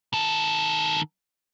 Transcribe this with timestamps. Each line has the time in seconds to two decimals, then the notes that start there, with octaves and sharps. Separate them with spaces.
0.14 D#3 A4